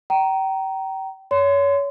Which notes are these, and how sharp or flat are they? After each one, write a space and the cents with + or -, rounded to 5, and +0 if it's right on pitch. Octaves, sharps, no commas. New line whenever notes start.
G5 -30 A#5 +0
C#5 +25 C6 -25